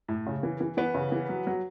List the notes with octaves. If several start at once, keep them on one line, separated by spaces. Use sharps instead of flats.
A2
C#3
E3
E3
E3 B3
C#3
E3
F#3
F#3